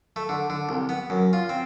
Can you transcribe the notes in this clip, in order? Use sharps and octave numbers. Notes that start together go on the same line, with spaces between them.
A3
D3
D3
C2
B3
F#2
F4
C4